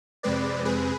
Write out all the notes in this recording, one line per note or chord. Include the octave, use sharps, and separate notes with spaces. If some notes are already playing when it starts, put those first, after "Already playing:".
F2 C3 G#3 C4 B4 D5
G#4 B4